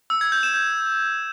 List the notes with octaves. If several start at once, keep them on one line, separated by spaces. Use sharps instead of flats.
E6
G#6
G6
E7
G6